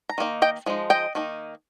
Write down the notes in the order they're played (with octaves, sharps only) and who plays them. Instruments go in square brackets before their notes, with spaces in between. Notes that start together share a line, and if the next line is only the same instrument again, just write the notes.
[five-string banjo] A#5
D#3 A#3 D#4
D#5 G5
F3 G#3 D#4
D#5 G5
D#3 A#3 D#4